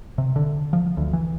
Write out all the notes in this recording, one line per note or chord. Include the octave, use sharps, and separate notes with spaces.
C3
D3
F3
D2
E3